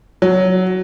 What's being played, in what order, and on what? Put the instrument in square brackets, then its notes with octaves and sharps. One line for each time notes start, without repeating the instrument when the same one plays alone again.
[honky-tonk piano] F#3